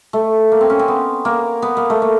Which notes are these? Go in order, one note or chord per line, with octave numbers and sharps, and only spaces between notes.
A3
A#3
C4
C#4
C4
B3
A#3
B3
A#3
A3
A#3